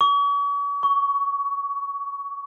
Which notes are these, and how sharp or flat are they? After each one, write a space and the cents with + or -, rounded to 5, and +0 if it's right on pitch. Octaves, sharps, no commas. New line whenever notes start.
C#6 +45
C#6 +15